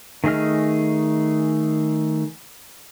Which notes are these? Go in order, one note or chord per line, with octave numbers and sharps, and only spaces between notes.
D#3 A3 G#4 D#5 F6